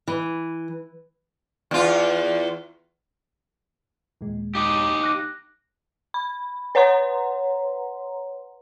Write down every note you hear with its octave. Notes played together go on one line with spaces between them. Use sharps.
E3
E2 F4
D#2 A#2 G#3
D#4 G4
D6 F#6 A#6
B5
B4 C#5 F#5 A#5 C6